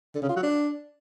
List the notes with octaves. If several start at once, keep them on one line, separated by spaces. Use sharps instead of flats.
D3
C#3
F4
F#3
D4